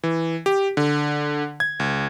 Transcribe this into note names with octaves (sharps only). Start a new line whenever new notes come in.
E3
G4
D3
G#6
C#2